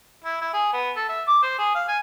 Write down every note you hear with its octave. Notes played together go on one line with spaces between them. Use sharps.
E4
E4
G#4
B3
A4
E5
D6
C5
G#4
F5
G#5